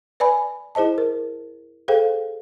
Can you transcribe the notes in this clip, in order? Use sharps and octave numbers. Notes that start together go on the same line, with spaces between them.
B4 D5 G#5 B5
E4 G#4 C5 D#5 A5
A#4
G#4 A4 C5 F5 G5